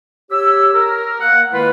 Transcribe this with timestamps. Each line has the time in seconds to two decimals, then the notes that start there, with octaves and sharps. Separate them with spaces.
0.30 G4 C#5 E6
0.73 A#4
1.20 A#3 F#5
1.52 D#3 G#3 A#3 E4 F4 B4